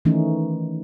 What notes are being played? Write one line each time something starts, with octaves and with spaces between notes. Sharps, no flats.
D#3 E3 A3 C#4 D#4